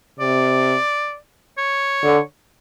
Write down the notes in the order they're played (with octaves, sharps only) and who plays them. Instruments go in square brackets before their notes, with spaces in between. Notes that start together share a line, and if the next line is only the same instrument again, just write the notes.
[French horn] C3 [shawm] D5
[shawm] C#5
[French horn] D3